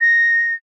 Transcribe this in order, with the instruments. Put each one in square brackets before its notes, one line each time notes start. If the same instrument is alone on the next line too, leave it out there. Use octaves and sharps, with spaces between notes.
[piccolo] A#6